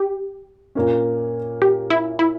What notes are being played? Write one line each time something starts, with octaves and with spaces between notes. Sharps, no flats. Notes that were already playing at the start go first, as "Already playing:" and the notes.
Already playing: G4
A#2 A#3 C#4
G4
E4
E4